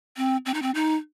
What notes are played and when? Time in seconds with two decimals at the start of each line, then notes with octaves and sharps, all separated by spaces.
0.17 C4
0.46 C4
0.54 D#4
0.62 C4
0.75 D#4